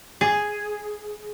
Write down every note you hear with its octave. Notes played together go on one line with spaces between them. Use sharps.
G#4